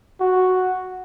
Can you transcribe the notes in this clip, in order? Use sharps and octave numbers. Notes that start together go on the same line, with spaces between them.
F#4